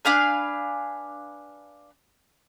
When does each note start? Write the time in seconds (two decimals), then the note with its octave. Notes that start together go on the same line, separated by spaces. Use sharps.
0.05 D4 B4 F5 G#5